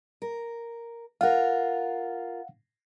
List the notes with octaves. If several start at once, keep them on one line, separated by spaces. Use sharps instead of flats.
A#4
F4 A#4 F5 F#5